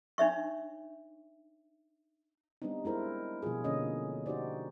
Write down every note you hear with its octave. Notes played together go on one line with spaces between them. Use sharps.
D4 D#4 C#5 E5 C#6
G3 B3 C4 D4 D#4
G#3 E4 A#4 C5
B2 F3 G3 F4 G#4
B2 D3 A#3 C#4 D#5
D#4 F#4 G4 C5 D5